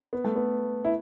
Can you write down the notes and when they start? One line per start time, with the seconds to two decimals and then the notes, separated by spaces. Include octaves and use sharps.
0.13 B3
0.25 A3
0.36 B3
0.85 E4